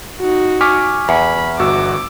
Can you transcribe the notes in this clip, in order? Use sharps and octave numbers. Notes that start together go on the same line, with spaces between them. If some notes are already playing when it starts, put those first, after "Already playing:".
D#4 F#4
G#5 C#6 D6 F6 B6
E2 B5
G1 F#4 D6 E6